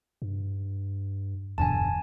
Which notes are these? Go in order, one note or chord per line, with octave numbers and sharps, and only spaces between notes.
G2
E1 E2 G2 D3 G#5 A5